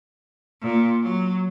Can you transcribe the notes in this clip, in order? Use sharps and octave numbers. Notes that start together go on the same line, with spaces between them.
A#2
F#3